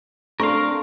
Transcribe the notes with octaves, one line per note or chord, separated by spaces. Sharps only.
A3 C4 D4 A#4 F5 C6 C#6